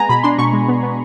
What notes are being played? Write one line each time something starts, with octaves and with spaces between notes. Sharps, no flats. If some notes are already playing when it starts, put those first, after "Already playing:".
Already playing: G#3 B3 G#5 A#5
B2 B5
D4 C6
B2 C#6
G#3
B3
B3